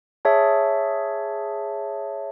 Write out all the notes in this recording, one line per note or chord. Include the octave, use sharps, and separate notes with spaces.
G#4 C#5 E5 A5